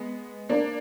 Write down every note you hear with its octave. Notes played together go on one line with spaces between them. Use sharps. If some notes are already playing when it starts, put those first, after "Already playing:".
Already playing: G#3 B3
A#3 D4